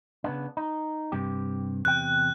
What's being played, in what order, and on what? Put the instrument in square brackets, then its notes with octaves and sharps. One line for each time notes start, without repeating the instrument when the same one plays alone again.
[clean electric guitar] C#3 B3 D4
D#4
G2 C3 G4
[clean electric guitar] E2 C3 G5 [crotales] F#6